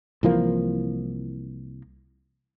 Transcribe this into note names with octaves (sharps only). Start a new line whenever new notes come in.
C2 E3 F3 A#3